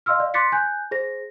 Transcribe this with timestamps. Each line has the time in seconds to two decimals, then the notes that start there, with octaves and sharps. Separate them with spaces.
0.06 D#5 F5 C6 E6 F6
0.18 D5 F5
0.34 C6 D6 F#6 A6 B6 C#7
0.52 G#5 F#6 G6
0.91 G#4 C5 A#6